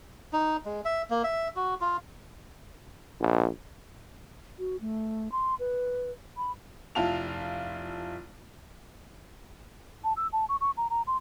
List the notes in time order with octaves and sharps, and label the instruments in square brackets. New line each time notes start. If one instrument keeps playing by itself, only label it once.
[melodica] D#4
G#3
E5
A#3
E5
F#4
F4
[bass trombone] A#1
[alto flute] F#4
A3
C6
B4
B5
[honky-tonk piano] F1 E4 F4 F5 A5 F7
[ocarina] A5
E6
A5
C#6
C#6
A#5
A#5
C6